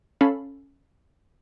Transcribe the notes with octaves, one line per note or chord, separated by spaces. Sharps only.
C#4 A4 F5 B5